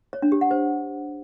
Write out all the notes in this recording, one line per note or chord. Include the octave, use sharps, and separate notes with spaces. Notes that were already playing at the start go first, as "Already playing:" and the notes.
C#5
D4
G4
F#5
C5